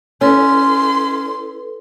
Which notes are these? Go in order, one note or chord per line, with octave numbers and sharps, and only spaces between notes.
C#4 E4 A4 B4 C6